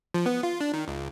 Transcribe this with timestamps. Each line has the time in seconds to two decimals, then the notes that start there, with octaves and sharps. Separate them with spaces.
0.14 F3
0.26 B3
0.43 F4
0.61 D4
0.74 D#3
0.88 C#2